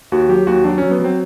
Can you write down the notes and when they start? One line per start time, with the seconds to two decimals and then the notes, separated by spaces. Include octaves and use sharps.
0.12 D#2 F#4
0.29 F#3 G4
0.47 D#2 F#4
0.64 F#3 D4
0.78 F#3 C#4
0.91 B3
1.00 F#3 C4